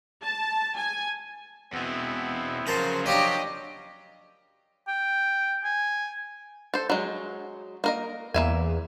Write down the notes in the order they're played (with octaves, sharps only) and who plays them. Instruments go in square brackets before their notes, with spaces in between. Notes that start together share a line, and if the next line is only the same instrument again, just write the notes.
[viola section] A5
G#5
[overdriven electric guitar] E2 B2 [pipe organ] B3 C4 E4
[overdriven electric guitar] C#3 [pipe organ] F3 F#3 [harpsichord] A#4 A5 C6 [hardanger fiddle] C5
[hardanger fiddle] D4 G4 [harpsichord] C#5 F5 A#5 [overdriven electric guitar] D#5
[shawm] G5
G#5
[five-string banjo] A4 C5
F#3 G#3
A#3 A#4 D#5
[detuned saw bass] E2 [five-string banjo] A#3 E5 G#5